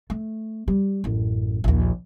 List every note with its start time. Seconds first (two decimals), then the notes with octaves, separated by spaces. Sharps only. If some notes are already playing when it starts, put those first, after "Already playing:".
0.10 A3
0.68 G3
1.04 A1 F#2
1.64 A#1 D#2